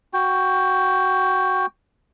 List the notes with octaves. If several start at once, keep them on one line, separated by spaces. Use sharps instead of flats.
F#4 G5